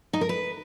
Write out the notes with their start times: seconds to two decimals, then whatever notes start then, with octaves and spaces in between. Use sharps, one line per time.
0.13 D#4
0.21 A#4
0.29 B4